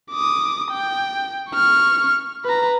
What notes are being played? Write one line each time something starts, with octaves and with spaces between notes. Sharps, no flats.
D6 D#6
G5
C#6 F6
B4 A#5